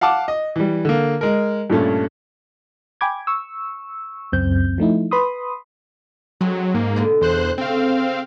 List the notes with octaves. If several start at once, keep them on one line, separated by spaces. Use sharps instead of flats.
F5 F#5 A5 D6
D#5
E3 G3
D3 A#3
G#3 A#4
G2 A#2 A3 C#4
G5 G#5 B5 D6 G#6
C#6 E6
C#2 F#2 C4 G6
F3 A3 D#4 E4
B4 B5 C6 D#6
F#3 G#3 C4 C#4
G#2 A#3
B2 D3 B3
E2 C5 F#6
C#3 A3 C4 F5